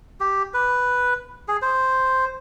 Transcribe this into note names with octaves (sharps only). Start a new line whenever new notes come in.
G4
B4
G#4
C5